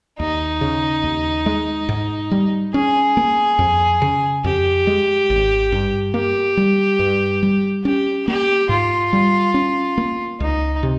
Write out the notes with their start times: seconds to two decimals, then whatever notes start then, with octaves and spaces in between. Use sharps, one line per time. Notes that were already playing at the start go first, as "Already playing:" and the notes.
0.19 D#2 D#4
0.61 C#3
1.04 D#2
1.46 G#3
1.89 G#2
2.31 G3
2.74 C#4 G#4
3.17 A#3
3.59 F2
4.02 C#3
4.44 F2 G4
4.87 G#3
5.30 G#1
5.72 G2
6.14 A#3 G4
6.57 G3
6.99 G2
7.43 G3
7.84 C#4 G4
8.27 A#3 G4
8.69 G#2 F4
9.13 G3
9.54 C#4
9.98 A#3
10.39 C#2 D#4
10.83 C3